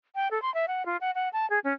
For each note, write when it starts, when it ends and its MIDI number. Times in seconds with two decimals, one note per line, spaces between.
0.15 0.28 79
0.31 0.41 69
0.42 0.52 84
0.54 0.66 76
0.68 0.85 78
0.86 0.97 65
1.01 1.11 78
1.15 1.29 78
1.33 1.48 81
1.50 1.59 68
1.64 1.73 61